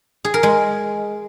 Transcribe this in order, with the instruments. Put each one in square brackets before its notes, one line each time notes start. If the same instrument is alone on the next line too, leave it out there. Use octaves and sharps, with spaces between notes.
[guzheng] G#4
A#4
G#3